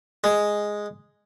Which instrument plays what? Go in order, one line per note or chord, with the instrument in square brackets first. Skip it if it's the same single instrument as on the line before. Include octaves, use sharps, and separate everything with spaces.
[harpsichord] G#3